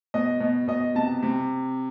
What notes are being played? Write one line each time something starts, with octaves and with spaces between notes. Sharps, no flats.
B2 D#5
B2
B2 D#5
C3 A5
C3